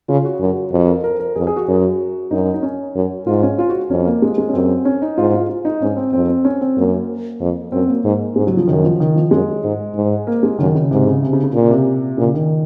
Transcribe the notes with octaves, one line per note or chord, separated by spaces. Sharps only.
C#3 F4
F#4
F#2
F2
A#4
A#4
A#4
F2 G#4
G#4
F#4
F#2
F#2 D#4
D#4
C#4
F#2
G#2 F4
C#4
F4
F#4
F2 C#4
A#3
G#3
G#3
C#4
F#2 C4
C#4
D#4
G#2 F4
F4
F4
D#4
G#2 C#4
C4
F2 C4
C4
C#4
C4
F#2 A#3
F2
F#2 C4
A#3
G#2
G#2 G#3
F#3
F3
F#2 D#3
F3
D#3
F3
F#2 G#3
G#2
G#2
A#3
G#3
F#2 D#3
C#3
G#2 C3
C#3
C3
C#3
C#3
A#2 C#3
C3
A#2 C#3
D#3